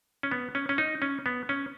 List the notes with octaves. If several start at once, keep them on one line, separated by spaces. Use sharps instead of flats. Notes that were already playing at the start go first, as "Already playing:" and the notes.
C#4
B3
C#4
C#4
D#4
C#4
B3
C#4